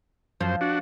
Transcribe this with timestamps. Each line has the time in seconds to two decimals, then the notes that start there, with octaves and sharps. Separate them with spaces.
0.41 F#2 F3 C5
0.61 D4 F#4